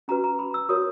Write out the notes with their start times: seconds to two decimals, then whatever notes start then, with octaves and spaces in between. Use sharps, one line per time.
0.08 C#4 F#4 B4 A#5
0.24 A#5
0.39 B5
0.54 E6
0.69 F#4 A#4 C#5 D#6